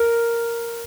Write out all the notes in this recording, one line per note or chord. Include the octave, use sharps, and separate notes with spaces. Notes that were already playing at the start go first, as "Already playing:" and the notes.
Already playing: A#4